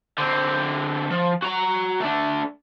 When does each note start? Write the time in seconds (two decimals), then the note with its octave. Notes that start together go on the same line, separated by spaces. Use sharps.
0.18 D3 C4
1.10 F3
1.42 F#4 A#5
2.01 A3 D4